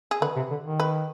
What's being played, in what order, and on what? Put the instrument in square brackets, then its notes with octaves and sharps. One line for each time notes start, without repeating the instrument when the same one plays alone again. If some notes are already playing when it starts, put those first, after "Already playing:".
[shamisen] G#4
[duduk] D3 [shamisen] B4
[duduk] C3
D3
D#3
[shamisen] B4